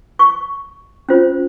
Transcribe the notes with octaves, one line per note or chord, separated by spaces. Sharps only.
C#6
C#4 F4 C5